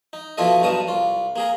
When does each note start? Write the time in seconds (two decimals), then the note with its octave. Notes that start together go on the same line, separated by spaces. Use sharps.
0.13 D#4
0.38 B2 F3 E4 F4 A4 D#5
0.61 B1 G2 B2 A#4 A5 D#6
0.88 C2 F4
1.36 A#3 G#4 A#4